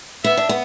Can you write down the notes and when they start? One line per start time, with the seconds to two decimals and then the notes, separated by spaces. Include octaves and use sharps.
0.24 B3 E5
0.37 D4
0.49 B3